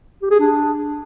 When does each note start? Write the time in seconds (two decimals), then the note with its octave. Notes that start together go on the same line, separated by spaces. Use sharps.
0.22 G4
0.31 G#4
0.40 D4